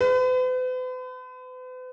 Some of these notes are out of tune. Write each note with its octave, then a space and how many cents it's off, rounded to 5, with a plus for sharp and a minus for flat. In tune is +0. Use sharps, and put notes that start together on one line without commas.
B4 +45